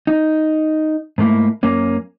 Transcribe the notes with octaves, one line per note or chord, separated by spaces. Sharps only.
D#4
G#2 A3 A#3 E4
F#2 A#3 C#4